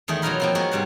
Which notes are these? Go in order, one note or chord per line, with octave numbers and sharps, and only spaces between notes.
E2 D#3 A3 G#4
B2 F#3 D#4 F4 A#4 B5
F3 A#3 C4
G#3 B3 F#4 A#4 C#5 G5
G#2 C3 G3 C5 F#5